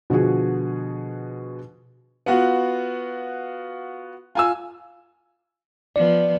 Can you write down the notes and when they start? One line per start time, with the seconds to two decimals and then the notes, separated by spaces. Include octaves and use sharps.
0.10 B2 D3 F3 F#4 G#4
2.26 B3 F4 F#4
4.35 F4 G#5 E6
5.96 F3 B3 D5